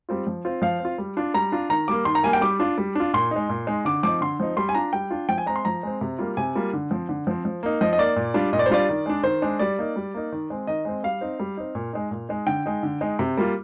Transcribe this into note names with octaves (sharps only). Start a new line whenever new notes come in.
G3 C4 F4
F3
C4 F4
F3 F5
C4
F4
G3
D4 F4
G3 A#5
D4 F4
D#3 A#5
G3 A#3 D6
D#3 C6
A#5
G3 A#3 G#5
G5
G3 D6
D4 F4
G3
D4 F4
A#2 C6
G#3 D#4
A#2
G#3 D#4
D3 D6
F3 C4 D#4 D6
D3 C6
F3 C4 D#4
G3 C6
G#5
D4 F4 A#5
G3 G5
D4 F4
F3 G5
G#5
G#3 C4 A#5
C6
F3 A#5
G#3 C4
C3
G3 A#3 F4
C3 G#5
G3 A#3 F4
D3
F3 C4
D3
F3 C4
F3
A#3 D#4
F3 D#5
D#5
A#3 D#4 D5
A#2
G3 D4 F4
A#2 D#5
D5
C5
G3 D4 F4 D5
D#3
G#3 D4
D#3 C5
G#3 D4
G3 D5
A#3 D#4
G3
A#3 D#4
D#3
G#3 C4
D#3 D#5
G#3 C4
G3 F5
C4 D#4
G3
C4 D#4
A#2
G#3 D#4
A#2
G#3 D#4
D3 G5
G#3 D#4
D3
G#3 D#4
C3
G3 A#3 F4